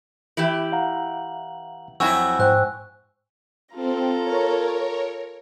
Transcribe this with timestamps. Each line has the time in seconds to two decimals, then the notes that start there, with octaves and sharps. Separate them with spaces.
0.37 E3 E4 G4 F#7
0.72 F5 F#5 A#5
2.00 F2 F#3 C4 E4 F#4 G#5 C#6 E6
2.39 G#2 C5 G5 E6 F#6
3.75 C4 F4 A4 A#5
4.22 A#4 C#5